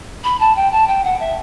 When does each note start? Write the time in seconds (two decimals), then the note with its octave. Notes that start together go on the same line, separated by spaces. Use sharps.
0.24 B5
0.40 A5
0.56 G5
0.71 A5
0.87 G5
1.04 F#5
1.19 E5